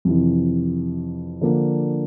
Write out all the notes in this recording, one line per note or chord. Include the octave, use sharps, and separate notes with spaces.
F2 C3 E3
D3 F3 A#3 D4